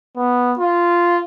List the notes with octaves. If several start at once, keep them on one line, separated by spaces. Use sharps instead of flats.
B3
F4